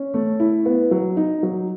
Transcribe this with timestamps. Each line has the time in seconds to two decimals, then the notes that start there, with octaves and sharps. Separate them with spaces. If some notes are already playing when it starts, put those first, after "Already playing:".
Already playing: C#4
0.14 A3
0.40 E4
0.66 B3
0.91 F#3
1.17 D#4
1.43 F#3